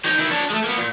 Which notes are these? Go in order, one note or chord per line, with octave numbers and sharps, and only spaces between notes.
D#4 C#5
D#3 E4
D4 C#5
G#3 A3
A#3 B3
A#2